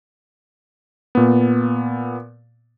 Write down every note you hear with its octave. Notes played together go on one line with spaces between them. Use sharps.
A#2 B3